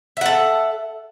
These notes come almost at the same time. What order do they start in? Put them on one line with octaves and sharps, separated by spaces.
E5 F#5 A4